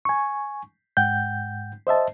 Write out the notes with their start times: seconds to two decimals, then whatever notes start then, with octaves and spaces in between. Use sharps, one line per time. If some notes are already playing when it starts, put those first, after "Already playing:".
0.05 G#5 C#6
0.97 G#2 F#5 G5 G6
1.87 C5 D#5 E5 A5